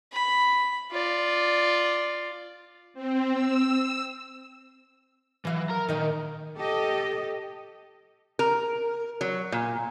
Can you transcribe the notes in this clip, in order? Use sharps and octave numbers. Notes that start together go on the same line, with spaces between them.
B5
F4 D5
C4
E6
E3 F#3 F5
A#4 A#5
A#2 D#3 D#4 A#4
G4 A4 D#5
A#4
F#3
A#2